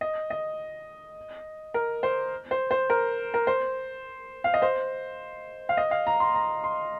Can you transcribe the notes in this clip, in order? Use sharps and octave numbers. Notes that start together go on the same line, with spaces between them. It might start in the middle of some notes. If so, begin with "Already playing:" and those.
D#5
D#5
A#4
C5
C5
C5
A#4
A#4
C5
F5
D#5
C5
F5
D#5
F5
A#5
C6
A#5
C6